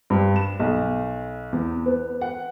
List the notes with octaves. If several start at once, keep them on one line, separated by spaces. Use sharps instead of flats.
G2
E7
B1
E2
B3
F#5